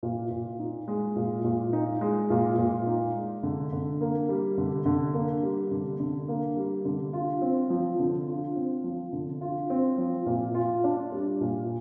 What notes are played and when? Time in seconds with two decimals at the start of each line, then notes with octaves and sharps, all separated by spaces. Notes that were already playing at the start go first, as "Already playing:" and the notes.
0.03 A#2
0.31 A#2
0.59 D#4
0.88 G#3
1.16 A#2
1.44 A#2
1.73 D#4
2.01 G#3
2.30 A#2
2.58 A#2
2.87 D#4
3.15 G#3
3.43 D3
3.72 D3
4.01 A#3
4.29 G3
4.58 D3
4.86 D3
5.14 A#3
5.43 G3
5.71 D3
6.00 D3
6.28 A#3
6.57 G3
6.85 D3
7.13 F4
7.42 C4
7.70 F3
7.99 D3
8.28 F4
8.56 C4
8.84 F3
9.13 D3
9.41 F4
9.70 C4
9.98 F3
10.26 A#2
10.55 F4
10.84 D4
11.12 G3
11.41 A#2